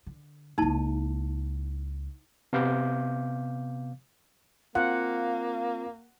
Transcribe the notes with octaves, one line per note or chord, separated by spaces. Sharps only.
D3
C#2 A#3 D#4 E4 A5
C3 B3 F5 D6 G6
A#3 C4 F4 F5 F#5